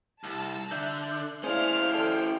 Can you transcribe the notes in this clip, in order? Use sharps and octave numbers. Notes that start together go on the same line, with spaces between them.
C2 A5 A#5 E6
D3 E5 F#6 G6
C#4 E4 G#4 C5 D5 F5 F6
A4 G5